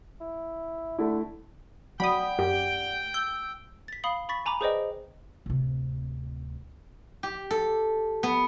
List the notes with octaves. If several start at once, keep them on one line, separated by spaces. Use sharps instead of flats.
E4
D3 A3 E4
F#3 D5 F#5 G5 B5 D#6
F#2 G4
E6 G6
A6 B6
F5 B5 D#6 C7 F#7 G7
B5 C#6 A6 B6
G#5 A#5 B5 D6
G#4 B4 C5 D5 D#5 G5
D1 C3
G4
A4
B3